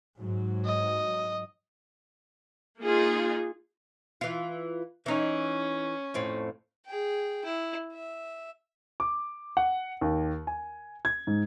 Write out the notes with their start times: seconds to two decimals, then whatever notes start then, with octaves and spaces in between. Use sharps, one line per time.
0.19 G#2 F#3
0.65 D#5
2.80 A#3 D#4 F4 G#4
4.21 E3 F4
5.06 E3 C#4 D#4
6.14 F2 A2 C4
6.86 G#4 G5
7.45 E4
7.93 E5
9.00 D6
9.57 F#5
10.01 D#2
10.47 G#5
11.05 G#6
11.27 G#2